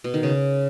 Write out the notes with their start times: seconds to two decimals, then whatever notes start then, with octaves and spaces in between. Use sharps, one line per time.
0.04 B2
0.14 D#3
0.23 C#3